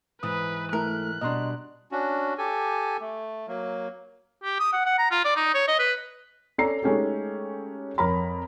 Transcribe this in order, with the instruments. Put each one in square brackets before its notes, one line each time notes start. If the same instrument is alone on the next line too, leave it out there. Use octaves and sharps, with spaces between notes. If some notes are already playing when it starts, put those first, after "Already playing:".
[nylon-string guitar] G#2 E3 [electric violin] B4 [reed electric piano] D#6
[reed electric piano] A3 E4 A4 [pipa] A#4 [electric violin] F#6
[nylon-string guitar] B2 G3 D4 [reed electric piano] D#5 A#5 C6
[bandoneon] C#4 D4 F#4
G4 A4 G#5
A3
F#3 A#3
[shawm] G4
D#6
F#5
F#5
A#5
F4
D5
D#4
C#5
D#5
B4
[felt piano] C#4 A4 D5 A#5 C7
G#3 A3 C#4 D#4 G4 A4
F2 A#4 C#5 A#5 B5